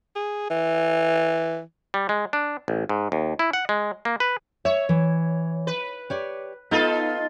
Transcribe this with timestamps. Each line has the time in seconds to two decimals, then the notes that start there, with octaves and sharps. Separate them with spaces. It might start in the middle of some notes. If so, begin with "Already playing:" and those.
0.15 G#4
0.50 E3
1.94 G3
2.09 G#3
2.33 D4
2.68 A1
2.89 G#2
3.12 D#2
3.39 E4
3.53 F#5
3.69 G#3
4.05 A#3
4.20 B4
4.65 C#5 E5
4.89 E3
5.67 B4
6.10 G4 C#5 D5
6.71 B3 D#4 F4 A4